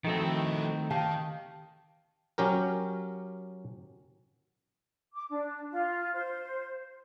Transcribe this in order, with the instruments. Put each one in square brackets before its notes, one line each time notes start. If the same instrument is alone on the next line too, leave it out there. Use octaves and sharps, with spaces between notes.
[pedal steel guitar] D#3 A3 C4 [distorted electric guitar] F3 E4 [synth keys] F#4 A4 D#5
[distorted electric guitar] D#3 [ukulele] G4 F5 A5
[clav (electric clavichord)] F#3 C#4 G4 A#4
[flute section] D6
D4
F4
C5